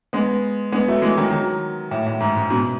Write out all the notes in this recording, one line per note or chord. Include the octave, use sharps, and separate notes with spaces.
G#3 B3
G#3 B3
F#3 A3
E3 G#3
D#3 F#3
D#3 F#3
A2
A2
G#2
G#2
G#2 B2